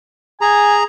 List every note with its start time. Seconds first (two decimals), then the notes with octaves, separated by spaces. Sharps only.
0.41 G#4 G#5 A#5